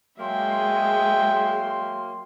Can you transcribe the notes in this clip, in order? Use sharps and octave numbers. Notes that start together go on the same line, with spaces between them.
F#3 G#3 A#3 E5 G5 C6